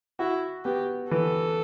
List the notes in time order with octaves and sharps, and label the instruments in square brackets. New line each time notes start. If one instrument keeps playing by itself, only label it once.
[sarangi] E4 [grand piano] F#4
[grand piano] B3 [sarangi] G4
[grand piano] E3 [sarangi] A4